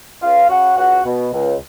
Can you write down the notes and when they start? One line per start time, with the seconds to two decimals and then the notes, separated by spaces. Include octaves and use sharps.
0.22 C#2 F4 F5
0.49 C#3 F#4 F#5
0.77 C#2 F#4 F#5
1.06 B2
1.33 C#2